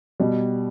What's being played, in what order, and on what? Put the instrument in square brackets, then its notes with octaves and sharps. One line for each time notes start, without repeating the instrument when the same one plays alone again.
[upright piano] B2 [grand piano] G3